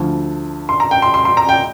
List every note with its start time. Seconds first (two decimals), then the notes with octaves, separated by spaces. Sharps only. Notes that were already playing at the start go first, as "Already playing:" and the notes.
Already playing: D2 D3 F3
0.69 C6
0.80 A#5
0.91 G5
1.02 C6
1.14 C6
1.25 C6
1.37 A#5
1.49 G5